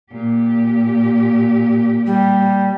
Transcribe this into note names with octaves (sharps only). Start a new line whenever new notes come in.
A#2 G4
G3